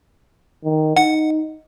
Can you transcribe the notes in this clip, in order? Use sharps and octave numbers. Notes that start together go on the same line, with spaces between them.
D#3
D#4 F#5